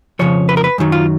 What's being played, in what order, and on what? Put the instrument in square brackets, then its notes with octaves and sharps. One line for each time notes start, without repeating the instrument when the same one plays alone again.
[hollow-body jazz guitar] F2 C#3 F3 C#5
B4
A#4
B4
F#2 D#3 F#3
F4